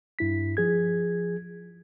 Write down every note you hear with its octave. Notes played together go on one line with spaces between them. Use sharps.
G2 E4 B6
F3 G#4 G#6